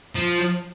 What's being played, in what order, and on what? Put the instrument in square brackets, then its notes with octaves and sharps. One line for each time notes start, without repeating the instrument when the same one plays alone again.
[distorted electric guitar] F3